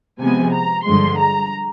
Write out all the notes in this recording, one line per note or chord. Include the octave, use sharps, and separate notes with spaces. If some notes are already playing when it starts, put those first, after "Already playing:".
C3 F3 G#3 B3 G#5
A#5
G2 D3 F3 G#3 C6
A#5